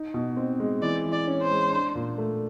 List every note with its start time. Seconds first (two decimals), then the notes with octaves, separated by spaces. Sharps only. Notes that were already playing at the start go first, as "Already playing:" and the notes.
Already playing: D#4
0.14 B2
0.37 C4
0.60 G#3
0.82 E3 D5
1.04 E3
1.12 D5
1.27 C#4
1.42 C5
1.50 G#3
1.72 D4
1.95 A#2
2.18 A3